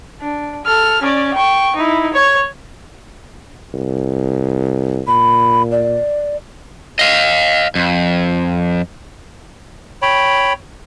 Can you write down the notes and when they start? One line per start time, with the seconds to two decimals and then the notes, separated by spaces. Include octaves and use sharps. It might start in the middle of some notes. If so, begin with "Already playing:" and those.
0.20 D4
0.65 A4 F6
1.02 C#4 D5
1.34 G5 C#6
1.76 D#4 E4
2.14 C#5
3.74 C2
5.08 A#2 B5
5.71 D5
6.99 D#5 F5
7.75 F2
10.02 C#5 G5 B5